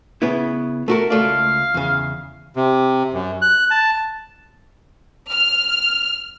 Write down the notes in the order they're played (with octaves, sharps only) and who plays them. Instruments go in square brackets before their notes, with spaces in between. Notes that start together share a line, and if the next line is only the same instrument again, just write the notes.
[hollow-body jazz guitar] C#3 B3 E4
A3 F#4 A#4
[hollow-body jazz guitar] C#2 A3 D5 [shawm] F5
[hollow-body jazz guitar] E2 C#3
[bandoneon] C3
F#2
F#6
A5
[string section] F6